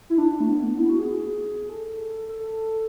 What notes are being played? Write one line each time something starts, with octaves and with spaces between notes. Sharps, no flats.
E4
D4
A3
B3
A3
B3
E4
F#4
G#4
A4
A4